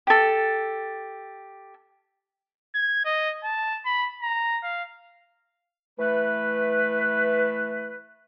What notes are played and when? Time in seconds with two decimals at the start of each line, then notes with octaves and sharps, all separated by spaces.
0.07 G4 A4
2.75 G#6
3.05 D#5
3.44 A5
3.86 B5
4.22 A#5
4.63 F5
5.98 E3 A3 B4